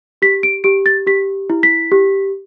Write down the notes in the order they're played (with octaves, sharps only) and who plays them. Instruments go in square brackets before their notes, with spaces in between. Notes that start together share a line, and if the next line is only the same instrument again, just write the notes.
[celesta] G4 B6
D7
G4 D7
A6
G4 B6
E4
B6
G4